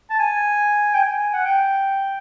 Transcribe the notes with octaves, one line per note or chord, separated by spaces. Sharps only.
A5
G#5
G5
G#5
F#5
G5